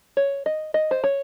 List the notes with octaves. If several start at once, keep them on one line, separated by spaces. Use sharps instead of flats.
C#5
D#5
D#5
C5
C#5